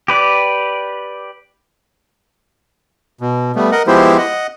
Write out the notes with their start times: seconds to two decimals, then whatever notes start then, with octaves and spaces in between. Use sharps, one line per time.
0.08 G4 B4 D5
3.21 B2
3.56 G3 A3 B3
3.72 A#4 D#5 F#5
3.87 F3 G#3 B3 E4 G4 C5
4.18 D#5 F#5